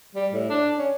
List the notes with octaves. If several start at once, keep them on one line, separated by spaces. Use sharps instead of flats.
G3
A2
D4
C#4